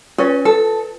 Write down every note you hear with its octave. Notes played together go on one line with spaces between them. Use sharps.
C#4 F4 B4
A4